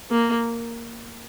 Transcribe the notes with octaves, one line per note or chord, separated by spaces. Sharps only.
A#3